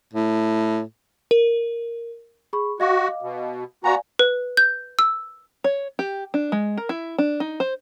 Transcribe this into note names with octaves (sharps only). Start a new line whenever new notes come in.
A2
A#4
G#4 B5 C#6
F#4 D#5 F5 D6
B2
B3 F#4 D5 F5 G#5 A#5
B4
G6
E6
C#5
G4
D4
G#3
A#4
E4
D4
D#4
C5